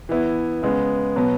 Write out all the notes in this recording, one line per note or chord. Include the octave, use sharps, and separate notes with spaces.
E3 B3 E4
C#3 G#3 B3
B2 F#3 B3